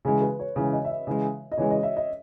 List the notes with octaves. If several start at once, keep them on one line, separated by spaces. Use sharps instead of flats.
C#3 E3 G#3 G#4
B4
C#5
C#3 E3 G#3 C#5
D#5
E5
D#5
C#3 E3 G#3
D#5
C#3 E3 G#3 C#5
D#5
E5
D#5